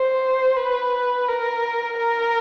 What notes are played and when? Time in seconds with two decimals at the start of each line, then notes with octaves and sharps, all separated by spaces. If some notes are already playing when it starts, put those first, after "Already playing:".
Already playing: C5
0.57 B4
1.28 A#4
1.97 A#4